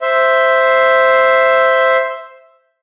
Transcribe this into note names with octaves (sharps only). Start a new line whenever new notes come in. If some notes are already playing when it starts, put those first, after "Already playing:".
C5 E5